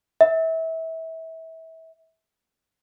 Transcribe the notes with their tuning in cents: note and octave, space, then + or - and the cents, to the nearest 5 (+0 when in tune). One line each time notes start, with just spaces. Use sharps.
E5 -25